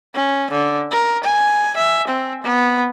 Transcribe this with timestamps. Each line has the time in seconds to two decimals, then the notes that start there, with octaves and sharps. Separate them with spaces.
0.14 C#4
0.51 D3
0.91 A#4
1.24 G#5
1.77 E5
2.08 C4
2.43 B3